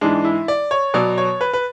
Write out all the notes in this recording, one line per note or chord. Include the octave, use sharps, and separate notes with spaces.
G#2 E3 G#3 D4
E4
D5
C#5
B2 F#3 D5
C#5
B4
B4